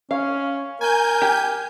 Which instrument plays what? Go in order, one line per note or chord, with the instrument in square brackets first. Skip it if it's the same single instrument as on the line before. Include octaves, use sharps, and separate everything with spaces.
[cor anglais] C#4 [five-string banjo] F5
[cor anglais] A#4 [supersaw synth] G#5 G6
[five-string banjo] G4